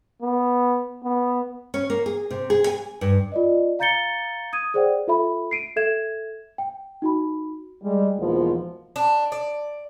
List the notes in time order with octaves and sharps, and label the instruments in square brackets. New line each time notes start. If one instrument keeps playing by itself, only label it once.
[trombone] B3
B3
[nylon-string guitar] C#4
A#3
G#4
C3
G#4
G#5
G2
[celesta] F4 D5 D#5
F5 A#5 G6 A6 C#7 G7
D#6 G#6 D#7
G#4 C5 D5 F#5 G5
F4 A4 E5 B5
C7 D7 D#7
A4 E5 G#6 E7
G5
D#4 F#4 B5
[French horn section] G3 G#3
E2 G#2 B2 F3 A#3
[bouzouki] D4
D5